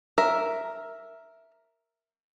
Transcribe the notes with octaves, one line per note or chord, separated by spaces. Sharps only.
A#4 E5